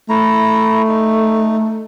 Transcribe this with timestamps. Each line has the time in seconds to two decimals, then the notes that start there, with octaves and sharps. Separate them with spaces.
0.09 A3 E4 A#5
0.87 D#4